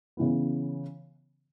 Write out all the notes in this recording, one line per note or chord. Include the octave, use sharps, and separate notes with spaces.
C#3 E3 B3